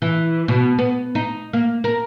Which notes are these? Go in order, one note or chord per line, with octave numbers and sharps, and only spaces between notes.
E3
B2
B3
D#4
A#3
A#4